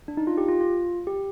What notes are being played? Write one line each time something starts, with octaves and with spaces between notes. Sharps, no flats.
D4
D#4
F4
G4
F4
F4
G4